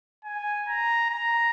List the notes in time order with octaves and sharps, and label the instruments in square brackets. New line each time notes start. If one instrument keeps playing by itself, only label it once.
[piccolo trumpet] G#5
A#5
A#5